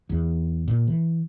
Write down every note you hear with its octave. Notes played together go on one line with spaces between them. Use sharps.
E2
A#2
E3